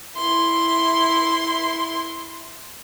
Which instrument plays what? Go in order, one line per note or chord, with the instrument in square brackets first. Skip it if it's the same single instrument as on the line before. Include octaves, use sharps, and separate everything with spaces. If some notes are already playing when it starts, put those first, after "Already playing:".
[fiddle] E4 C6